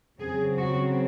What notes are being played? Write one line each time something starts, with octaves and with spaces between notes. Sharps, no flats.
C#3 F#3 C4 G#4
F#4